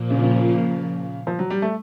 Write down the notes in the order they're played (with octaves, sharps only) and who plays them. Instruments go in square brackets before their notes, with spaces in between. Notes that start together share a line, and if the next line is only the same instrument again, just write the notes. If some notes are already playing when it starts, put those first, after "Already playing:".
Already playing: [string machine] A#2 F3 A#3
[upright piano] C#3
C#3
F3
F#3
G3
A3